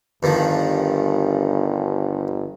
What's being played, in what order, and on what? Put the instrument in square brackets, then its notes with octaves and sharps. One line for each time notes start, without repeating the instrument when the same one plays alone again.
[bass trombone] G1 [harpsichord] G2 D#3 F3